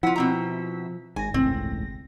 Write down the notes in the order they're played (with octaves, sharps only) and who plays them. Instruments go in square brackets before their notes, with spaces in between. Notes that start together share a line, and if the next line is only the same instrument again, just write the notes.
[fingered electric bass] F3 [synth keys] E4 E6 B6 [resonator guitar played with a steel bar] F4 F#5
[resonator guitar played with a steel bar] B2 C4 A#5
[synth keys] G#1 A#6 [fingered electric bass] G#2 [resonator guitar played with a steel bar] G#5
[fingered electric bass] E1 C#2 A2 [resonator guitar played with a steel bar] C4